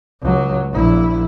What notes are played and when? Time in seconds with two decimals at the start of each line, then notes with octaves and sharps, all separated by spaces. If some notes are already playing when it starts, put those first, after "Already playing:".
0.22 C#2 F#3
0.72 A#1 E4